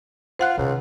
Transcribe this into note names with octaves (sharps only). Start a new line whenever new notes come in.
F4 C5 F#5 F#6
C#2 C3 D#3